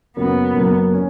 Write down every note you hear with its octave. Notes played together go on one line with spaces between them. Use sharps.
F#2 C#3 F#3 A#3 B3
F#2 C#3 F#3 A#3
C#4